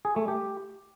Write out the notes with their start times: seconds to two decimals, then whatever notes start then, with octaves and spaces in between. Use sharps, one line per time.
0.05 G#4
0.16 A3
0.28 G4